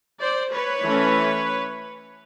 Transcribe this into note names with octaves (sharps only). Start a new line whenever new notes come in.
C5 D5
B4 C#5
E3 A3 C#4